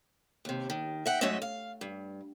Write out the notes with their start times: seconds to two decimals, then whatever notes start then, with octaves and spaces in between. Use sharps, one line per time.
0.45 D#2 C3
0.70 D#3
1.06 E5 F#5 G5
1.21 G#2 F#3 A3 C#4 D#5 E5
1.42 F5
1.81 G2